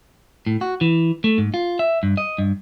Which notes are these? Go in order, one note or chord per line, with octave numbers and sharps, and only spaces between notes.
A2
F#4
E3
A3
G#2
F4
E5
G2
D#5
G2